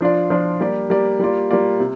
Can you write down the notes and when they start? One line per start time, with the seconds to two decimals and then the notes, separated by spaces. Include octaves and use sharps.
0.01 F3 D4 F4 D5
0.30 F3 D4 F4 D5
0.60 G3 A#3 G4 D5
0.90 G3 A#3 G4 D5
1.19 G3 A#3 F4 D5
1.51 G3 A#3 F4 D5
1.80 C3